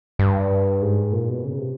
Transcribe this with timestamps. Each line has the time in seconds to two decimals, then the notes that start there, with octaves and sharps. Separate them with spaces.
0.19 G2
0.82 G#2
1.13 A#2
1.29 B2
1.45 C#3
1.59 C3